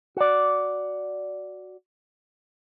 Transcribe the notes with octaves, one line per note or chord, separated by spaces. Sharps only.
F#4 D5